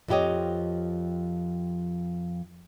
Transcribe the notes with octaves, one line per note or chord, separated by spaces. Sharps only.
F2 F3 E4 G4 C#5 D#5